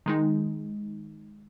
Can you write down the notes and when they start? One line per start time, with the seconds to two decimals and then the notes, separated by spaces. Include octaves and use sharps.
0.06 D#3 G#3 D#4